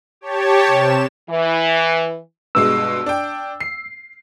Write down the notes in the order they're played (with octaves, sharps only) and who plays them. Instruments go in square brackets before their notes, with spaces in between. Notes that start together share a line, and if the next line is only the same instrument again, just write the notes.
[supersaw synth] G4 C#5 A5
C3 E7
[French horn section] E3
[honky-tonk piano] G2 B2 G#3 [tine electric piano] E6
[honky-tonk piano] D4 G5
C7